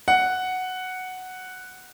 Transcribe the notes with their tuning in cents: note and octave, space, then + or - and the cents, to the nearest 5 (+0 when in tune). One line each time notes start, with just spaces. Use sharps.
F#5 +0